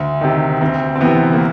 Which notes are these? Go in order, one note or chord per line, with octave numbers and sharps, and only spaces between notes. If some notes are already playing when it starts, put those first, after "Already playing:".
Already playing: D2
C3 D#3
D2 C4
C4
C3 E3 B3
A#3